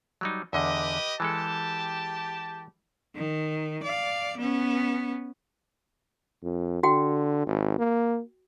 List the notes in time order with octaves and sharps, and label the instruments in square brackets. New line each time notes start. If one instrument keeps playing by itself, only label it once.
[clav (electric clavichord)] F#3 G3 D#4
[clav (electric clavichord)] E2 D3 [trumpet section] G4 B4 D#5
[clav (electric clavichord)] E3 G#3 A4 [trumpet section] G4 A5
[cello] D#3
D5 F5
B3 C#4
[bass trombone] F2
[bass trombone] D3 [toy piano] F#4 G5
[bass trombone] G#1
A#3